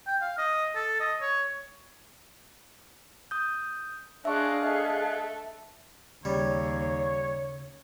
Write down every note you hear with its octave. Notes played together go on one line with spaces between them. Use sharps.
G5
F5
D#5
A4
D#5
C#5
D#6 G6
G#3 D4 G#4 E5 F5 C#6 F#6
A3 D#5
D#2 C#3 G3 C#5